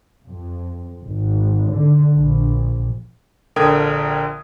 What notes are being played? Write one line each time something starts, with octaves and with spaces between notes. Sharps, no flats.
F2
G#1
D3
A#1
A#1 D3 A#4 G5 D#6 G#6